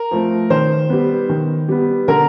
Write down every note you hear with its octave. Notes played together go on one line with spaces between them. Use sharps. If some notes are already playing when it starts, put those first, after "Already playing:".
Already playing: A#4
F3 A3 C4
D#3 C5
G3 B3
D#3
G3 B3
D3 A#4